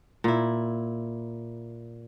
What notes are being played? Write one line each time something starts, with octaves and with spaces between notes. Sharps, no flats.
A#2 E4